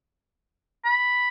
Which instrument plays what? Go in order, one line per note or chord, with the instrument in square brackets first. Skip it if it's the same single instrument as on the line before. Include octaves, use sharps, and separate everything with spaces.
[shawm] B5